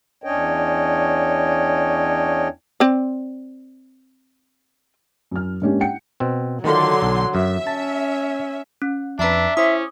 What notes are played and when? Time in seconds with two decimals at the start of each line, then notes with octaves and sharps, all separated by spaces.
0.24 E2 C#4 D4 C#5 D#5 G5
2.80 C4 D5
5.31 F#2 F6
5.62 G#2 A#3 C#4 D4 G4
5.81 F#5 G5 C#7
6.20 B2 C4
6.64 D3 D#3 F#3 F4 C6
7.02 B1
7.35 F#2 E5
7.67 C#4 A5
8.82 C#4
9.19 F2 D4 B4 E5 A5 A#5
9.57 C#4 E4 C5 D6 D#6